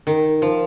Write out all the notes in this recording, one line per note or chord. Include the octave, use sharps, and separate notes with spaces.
D#3
F3